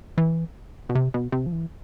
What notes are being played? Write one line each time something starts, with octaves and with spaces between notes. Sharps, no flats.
E3
B2
C3
B2
C3
F3
E3